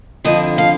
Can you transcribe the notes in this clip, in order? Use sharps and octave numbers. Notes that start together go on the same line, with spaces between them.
F2 D3 F3 D#5
F5